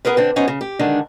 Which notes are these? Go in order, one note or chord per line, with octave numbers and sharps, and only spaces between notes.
B3 G#4 A#4 B4
D3 C4 D4
F#2 B3 C#4 D#4 C5
C#3
G4
D3 D#3 G#3 D4